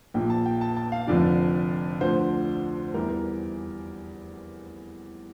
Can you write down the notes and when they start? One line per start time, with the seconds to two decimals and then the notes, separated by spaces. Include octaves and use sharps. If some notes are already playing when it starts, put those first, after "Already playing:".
0.14 A#1 A#2 F3 G5
0.30 A5
0.46 G5
0.61 A5
0.77 A5
0.92 F5
1.07 F1 F2 D3 F3 D5
2.01 D2 D3 F3 C5
2.94 E2 E3 G3 A#4
3.10 A#4